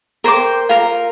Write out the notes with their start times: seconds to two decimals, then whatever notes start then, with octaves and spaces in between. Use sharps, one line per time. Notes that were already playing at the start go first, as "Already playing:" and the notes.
0.24 A#4 C5 G5 D6
0.69 F4 A#4 A#5